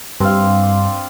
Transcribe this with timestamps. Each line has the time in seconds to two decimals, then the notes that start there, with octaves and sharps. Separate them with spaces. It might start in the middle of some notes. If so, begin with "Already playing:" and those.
0.20 G2 C4 D5 F5
0.63 D5